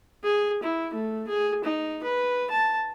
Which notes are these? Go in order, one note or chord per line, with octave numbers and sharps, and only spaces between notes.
G#4
E4
A3
G#4
D#4
B4
A5